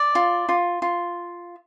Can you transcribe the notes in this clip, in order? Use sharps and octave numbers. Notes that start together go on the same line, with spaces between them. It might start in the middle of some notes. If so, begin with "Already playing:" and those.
Already playing: D5
F4
F4
F4